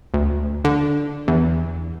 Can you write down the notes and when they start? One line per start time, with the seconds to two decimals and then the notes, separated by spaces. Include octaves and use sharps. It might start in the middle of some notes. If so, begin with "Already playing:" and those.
0.14 D2
0.65 D3
1.28 E2